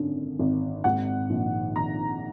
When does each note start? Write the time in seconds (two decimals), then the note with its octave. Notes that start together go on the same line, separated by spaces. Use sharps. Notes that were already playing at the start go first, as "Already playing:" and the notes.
Already playing: G#1 F#2 D3
0.39 G#1
0.84 G#2 F#5
1.30 A#1
1.76 D#3 A#5